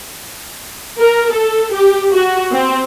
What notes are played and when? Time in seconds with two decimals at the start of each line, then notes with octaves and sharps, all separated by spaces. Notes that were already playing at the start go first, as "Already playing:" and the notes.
1.00 A#4
1.32 A4
1.73 G4
2.12 F#4
2.52 C4